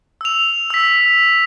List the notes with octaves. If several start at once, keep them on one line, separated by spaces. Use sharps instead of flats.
E6 F7
E6 B6